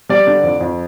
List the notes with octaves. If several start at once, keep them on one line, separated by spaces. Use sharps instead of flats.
G3 D5
D3
F2
F2